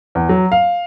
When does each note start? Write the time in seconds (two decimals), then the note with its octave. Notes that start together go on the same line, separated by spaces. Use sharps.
0.15 E2
0.29 F#3
0.52 F5